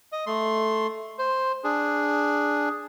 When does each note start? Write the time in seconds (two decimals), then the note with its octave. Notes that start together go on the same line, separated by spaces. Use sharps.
0.12 D#5
0.27 A3 C6
1.19 C5
1.64 D4 G#4